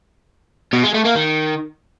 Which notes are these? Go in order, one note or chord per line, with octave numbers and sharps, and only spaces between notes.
B2
G#3
A3
A#3
D#3